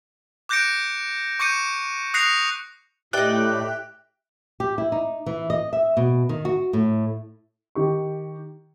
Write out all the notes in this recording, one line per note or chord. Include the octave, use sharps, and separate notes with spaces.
D6 F#6 G6 A#6 C#7 D7
C#6 D6 G6 C#7 D#7
D#6 F#6 A#6 C7 C#7 F7
A2 D#4 G4 D5 E5 G5 F#6
G4
E4
D#4
E3
D#5
E5
B2
D#3
F#4
A2
D#3 G4 C#6